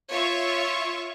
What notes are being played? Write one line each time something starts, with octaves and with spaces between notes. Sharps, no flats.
F4 C#5 E5 C#6